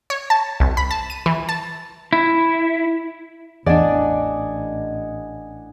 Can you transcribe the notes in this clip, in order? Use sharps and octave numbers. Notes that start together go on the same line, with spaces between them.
C#5
A5
C2
B5
A5
D#7
E3
A5
E4
A1 E2 D4 D5 D#5 F#5 G#5